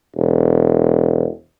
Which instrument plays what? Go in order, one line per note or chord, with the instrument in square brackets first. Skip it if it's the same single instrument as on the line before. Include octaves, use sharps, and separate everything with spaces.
[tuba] E1